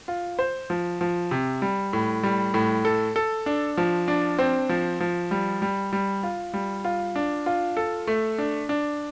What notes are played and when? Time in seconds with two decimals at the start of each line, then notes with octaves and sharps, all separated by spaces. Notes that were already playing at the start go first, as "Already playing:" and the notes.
0.08 F4
0.39 C5
0.70 F3
1.01 F3
1.31 C3
1.62 G3
1.93 A2
2.23 G3
2.54 A2
2.85 A4
3.16 A4
3.46 D4
3.77 F3
4.08 D4
4.38 C4
4.69 F3
5.00 F3
5.31 G3
5.62 G3
5.93 G3
6.23 F4
6.54 G3
6.85 F4
7.16 D4
7.46 F4
7.77 A4
8.07 A3
8.38 D4
8.69 D4